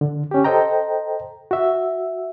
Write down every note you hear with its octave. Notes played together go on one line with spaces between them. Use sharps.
D3
C#4 G4
A4 C5 D#5 G5 A#5
F#4 E5